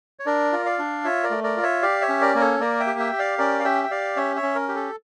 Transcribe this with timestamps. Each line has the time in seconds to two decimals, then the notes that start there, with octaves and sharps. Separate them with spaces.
0.19 C#5
0.26 D4 A#4 D5
0.52 F4
0.66 D5 F5
0.79 D4
1.04 F4 C#5 E5
1.23 A#4 D5
1.30 A3
1.44 A#4 D5
1.57 F4
1.63 C#5 E5
1.82 G4 D5 F5
2.01 C#5 E5
2.09 C#4
2.21 A#4 D5
2.35 A#3 A#4
2.40 A4 C#5
2.60 A#3 A#4 D5
2.80 E5 G5
2.87 G4
2.99 E5 G5
3.13 G4
3.19 D5 F5
3.38 C#4 A#4 D5
3.59 F5
3.65 G4 E5 G5
3.84 G5
3.91 G4 D5 F5
4.16 C#4 C#5 E5
4.36 C#5 E5
4.43 C#4
4.55 A#4
4.69 G4
4.75 A4